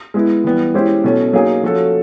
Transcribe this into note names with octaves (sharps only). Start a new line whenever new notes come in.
G#3 B3 E4
E3 G3 B3
G#3 C#4 E4 G4 C5
B2 F#3 A3 C#4
F#3 A#3 D#4 G#4
F3 A3 C#4 F#4 A4